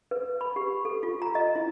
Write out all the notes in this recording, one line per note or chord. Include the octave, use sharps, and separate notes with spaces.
B4
B5
G4
A4
F4
A#5
D#5
E4